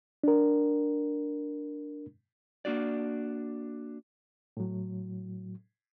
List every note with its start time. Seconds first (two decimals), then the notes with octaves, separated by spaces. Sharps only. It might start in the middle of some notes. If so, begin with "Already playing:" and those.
0.24 D4 A#4
2.65 A#3 D4 F#4 D5
4.57 A2 F#3